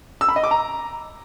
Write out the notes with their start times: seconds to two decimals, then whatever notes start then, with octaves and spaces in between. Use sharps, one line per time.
0.21 E6
0.29 B5
0.36 D#5
0.44 D6
0.51 A#5